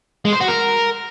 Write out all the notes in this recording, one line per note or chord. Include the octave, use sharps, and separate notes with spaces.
G#3
C5
F#4
A#4